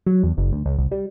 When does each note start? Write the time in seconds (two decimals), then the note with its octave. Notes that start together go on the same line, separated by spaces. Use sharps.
0.06 F#3
0.23 E2
0.37 F#1
0.52 D2
0.66 C#2
0.78 C2
0.91 G3